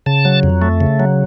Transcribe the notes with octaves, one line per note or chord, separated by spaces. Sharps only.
C#3 A5
F#3
F2
A3
C#3
F#3